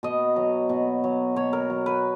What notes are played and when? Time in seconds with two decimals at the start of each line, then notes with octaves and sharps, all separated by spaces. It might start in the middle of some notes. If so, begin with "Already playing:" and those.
0.03 B2 D#5
0.36 F#3
0.69 B2
1.04 F#3
1.36 B2 C#5
1.53 A#4
1.70 F#3
1.86 B4